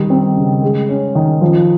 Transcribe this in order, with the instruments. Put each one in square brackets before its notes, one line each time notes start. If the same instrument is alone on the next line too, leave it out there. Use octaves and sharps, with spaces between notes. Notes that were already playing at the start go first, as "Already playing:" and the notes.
Already playing: [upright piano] D#3 G3
C4
C#3
G#3
C#4
D#3
F3